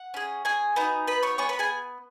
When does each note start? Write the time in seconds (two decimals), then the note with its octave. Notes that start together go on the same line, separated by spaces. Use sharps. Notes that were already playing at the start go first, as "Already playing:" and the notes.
Already playing: F#5
0.14 C#4 G#4
0.45 G#4 G#5
0.76 B3 D#4 F#4
1.07 B4 B5
1.23 C#5 C#6
1.38 B3 G#4 C#5 C#6
1.49 B4 B5
1.59 G#4 G#5